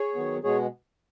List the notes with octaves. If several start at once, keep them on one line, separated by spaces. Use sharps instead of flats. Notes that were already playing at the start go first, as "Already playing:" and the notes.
Already playing: G#4 C#5
D#3 F#3 B3
B2 G#3 B3 G#4 C#5